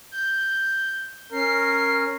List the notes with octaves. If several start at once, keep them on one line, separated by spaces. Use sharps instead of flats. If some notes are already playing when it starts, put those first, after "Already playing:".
G6
C#4 A#4 C7